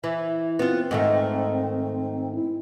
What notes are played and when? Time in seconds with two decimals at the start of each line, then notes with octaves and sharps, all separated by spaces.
0.04 E3 E5
0.59 B3 C4 F4
0.91 G#2 D#3 A3
2.35 E4